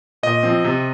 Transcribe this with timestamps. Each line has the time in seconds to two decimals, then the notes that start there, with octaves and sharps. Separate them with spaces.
0.23 A#2 D#5
0.43 F3 C4
0.64 C3